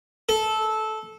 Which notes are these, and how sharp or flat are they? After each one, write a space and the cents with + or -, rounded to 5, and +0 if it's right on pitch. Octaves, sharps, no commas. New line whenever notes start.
A4 -15